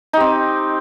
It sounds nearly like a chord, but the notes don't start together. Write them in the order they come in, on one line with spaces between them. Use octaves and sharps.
D#4 G4 C4